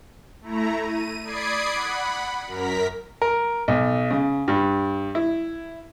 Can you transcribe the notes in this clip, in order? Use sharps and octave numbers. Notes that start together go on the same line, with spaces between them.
A3 E4 A#5
D#7
D5 B5 D#6 G#6 C7 D7
F#5 B5
F#2 A#4 A#5 B6
A#4
B1
C#3
G2
E4